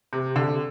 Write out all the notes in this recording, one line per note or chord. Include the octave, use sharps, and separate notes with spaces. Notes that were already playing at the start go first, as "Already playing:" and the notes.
C3
D3